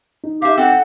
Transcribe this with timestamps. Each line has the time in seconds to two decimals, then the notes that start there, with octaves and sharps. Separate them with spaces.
0.24 D#4
0.42 G4 E5 F5
0.57 C4 A4 F#5